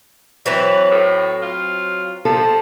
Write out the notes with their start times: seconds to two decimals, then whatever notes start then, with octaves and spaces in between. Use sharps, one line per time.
0.46 E3 F#3 C4 B4
0.91 A2
1.42 F4
2.25 F3 A4